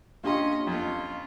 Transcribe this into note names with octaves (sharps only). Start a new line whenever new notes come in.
A#3 C#4 D4 F4 G4 D#5 C6
F2 C#4 F4